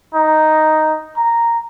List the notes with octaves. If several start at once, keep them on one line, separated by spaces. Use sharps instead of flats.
D#4
A#5